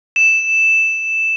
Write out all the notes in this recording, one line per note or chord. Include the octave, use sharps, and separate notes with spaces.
E7